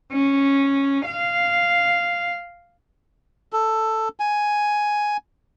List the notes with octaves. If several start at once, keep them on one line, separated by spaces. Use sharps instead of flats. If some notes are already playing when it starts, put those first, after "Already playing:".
C#4
F5
A4
G#5